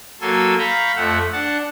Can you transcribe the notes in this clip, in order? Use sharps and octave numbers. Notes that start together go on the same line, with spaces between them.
F#3 A#3 A4 G#5 C6 E6
F5 A#5 B5 C#6 G6
F2 A3 E5 F#5
D4 F#5 A5